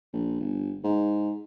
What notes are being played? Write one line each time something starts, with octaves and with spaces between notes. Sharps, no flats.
A#1
G1
G#2